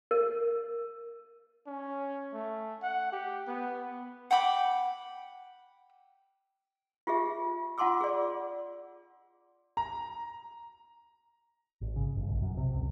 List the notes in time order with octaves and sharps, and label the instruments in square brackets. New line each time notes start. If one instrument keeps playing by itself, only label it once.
[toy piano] A#4
[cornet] C#4
A3
F#5
G4
B3
[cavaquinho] F#5 G5 B5 D6
[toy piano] F4 G4 G#4 E5
F4 F#5 A5 C6 D6 E6
G#4 D5
[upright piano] A#5
[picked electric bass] G#1
C#3
G1
B1
F#2
C3
C#2